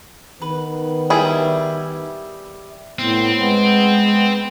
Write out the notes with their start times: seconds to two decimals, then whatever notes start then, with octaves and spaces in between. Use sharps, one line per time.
0.42 D#3 B3 B4
1.10 G3 E4 G#4 E5
2.99 A2 B3 C4
3.38 G#3 B3